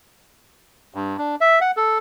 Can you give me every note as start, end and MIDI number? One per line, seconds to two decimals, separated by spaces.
0.95 1.17 43
1.18 1.35 62
1.41 1.59 76
1.61 1.71 78
1.77 1.98 69